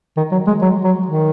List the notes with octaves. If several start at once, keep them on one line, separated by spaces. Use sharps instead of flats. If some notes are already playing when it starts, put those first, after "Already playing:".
D#3
F#3
G#3
F#3
F#3
D#3